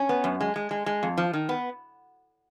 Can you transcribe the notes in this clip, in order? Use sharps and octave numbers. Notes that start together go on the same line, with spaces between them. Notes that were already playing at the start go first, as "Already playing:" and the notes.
Already playing: C#4
B3
F#2
G#3
G#3
G#3
G#3
F2
F3
D#3
B3